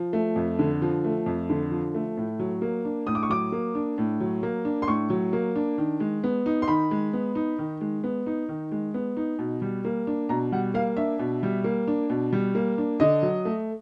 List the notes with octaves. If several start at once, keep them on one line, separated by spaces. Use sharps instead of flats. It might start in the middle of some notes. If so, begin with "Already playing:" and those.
Already playing: F3
A3
F2
D3
F3
A3
F2
D3
F3
A3
A2
F#3
A#3
D4
A2 D#6
D6
C#6
F#3 D6
A#3
D4
A2
F#3
A#3
D4
C6
A2 C#6
F#3
A#3
D4
D#3
G#3
B3
D#4
C6
D#3 B5
G#3
B3
D#4
D#3
G#3
B3
D#4
D#3
G#3
B3
D#4
B2
G3
A#3
D4
B2 A#5
G3 F#5
A#3 F5
D4 E5
B2
G3
A#3
D4
B2
G3
A#3
D4
D3 D#5
F#3
A3